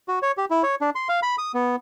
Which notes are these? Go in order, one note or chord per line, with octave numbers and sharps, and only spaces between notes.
F#4
C#5
G4
E4
C#5
D4
C6
F5
B5
D#6
B3